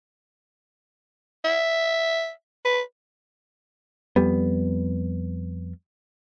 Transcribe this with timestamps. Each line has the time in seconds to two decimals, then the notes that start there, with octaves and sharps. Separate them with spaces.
1.45 E5
2.65 B4
4.16 F2 G3 B3